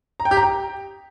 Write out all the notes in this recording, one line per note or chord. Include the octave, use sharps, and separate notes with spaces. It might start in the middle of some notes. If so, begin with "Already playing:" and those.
A#5
G5
G4
A#5
G5